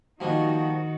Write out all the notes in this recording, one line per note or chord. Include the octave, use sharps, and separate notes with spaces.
D#3 F3 G3 A#3 D#4 F#4